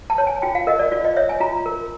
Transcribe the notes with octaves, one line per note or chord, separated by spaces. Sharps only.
A5
C#5
G#5
F4 G5
F5
A#4 D#5
D5
F4 D5
D#5
C#5 E5
G#5
F4 A#5
A#4